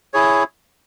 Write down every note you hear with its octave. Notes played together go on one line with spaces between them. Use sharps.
E4 G#4 C#5